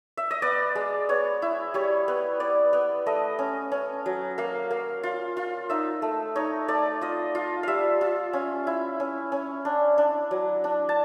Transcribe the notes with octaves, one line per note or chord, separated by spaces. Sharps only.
E5
D#5
B3 D5
G#3
B3 C#5
E4
G3 C#5
B3
B3 D5
B3
A3 D#5
C#4
C#4
F#3
A#3 F5
A#3
F4
F4
D#4 E5
A3
D#4 C#5
A3 D5
F4 D#5
F4
G3 E5 F5
F4
C#4
E4
C#4
C#4
D4
D4
F#3
D4
A5